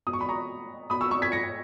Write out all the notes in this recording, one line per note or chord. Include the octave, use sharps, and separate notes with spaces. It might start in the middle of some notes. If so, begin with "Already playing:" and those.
B2 D#6
C#6
B5
A#5 C#6
B2 B5 D#6
C#6 E6
C#6 E6
G#6 B6
A#6 C#7